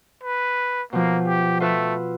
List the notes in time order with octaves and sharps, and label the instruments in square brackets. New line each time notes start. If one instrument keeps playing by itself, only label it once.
[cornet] B4
[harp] B2 F3 [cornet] A#3
[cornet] G4
[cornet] A3 [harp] F4 B4 E6